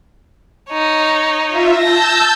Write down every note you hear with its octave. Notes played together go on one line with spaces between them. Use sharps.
D#4 C#5
F4 E5
A5 E6 G6 A#6